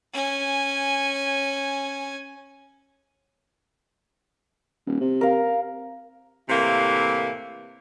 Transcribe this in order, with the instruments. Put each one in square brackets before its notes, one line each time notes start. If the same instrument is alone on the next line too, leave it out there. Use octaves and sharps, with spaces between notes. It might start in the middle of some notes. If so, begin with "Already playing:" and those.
[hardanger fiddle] C#4 G#5
[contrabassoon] D#1
C3
[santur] A#4 F5
[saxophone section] A2 C3 E3 A#3